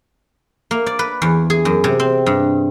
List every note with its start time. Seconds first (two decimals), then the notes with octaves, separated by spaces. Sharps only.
0.71 A#3
0.86 D5
0.99 B4
1.22 E2
1.50 G#4
1.65 F#2
1.84 C3
2.00 C4
2.26 G2